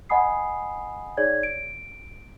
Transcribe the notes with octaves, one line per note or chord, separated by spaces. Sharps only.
D#5 F#5 G#5 B5 D#6 C7
D#4 G#4 C#5 D5 G#6
D7